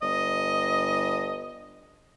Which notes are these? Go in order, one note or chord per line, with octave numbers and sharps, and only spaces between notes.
G1 D#5